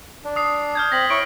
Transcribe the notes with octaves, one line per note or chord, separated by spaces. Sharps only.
D4
D#6 C7
F6 G6 G#6
C4 A#6 B6 F#7
E4 C#5 C#6 D7